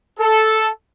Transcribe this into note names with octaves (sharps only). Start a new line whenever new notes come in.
A4